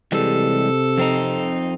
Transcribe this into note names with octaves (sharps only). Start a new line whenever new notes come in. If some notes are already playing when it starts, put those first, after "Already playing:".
C3 E3 G3 G#3 A4
F2 C4 D#4